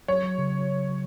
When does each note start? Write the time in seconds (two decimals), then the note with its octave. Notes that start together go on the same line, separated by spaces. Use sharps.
0.08 F#3 C#5
0.24 F#3
0.38 C#3